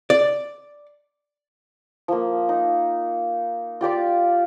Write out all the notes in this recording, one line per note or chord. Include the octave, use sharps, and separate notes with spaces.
D5
F3 A#3
D#4
F4 G4 D5 D6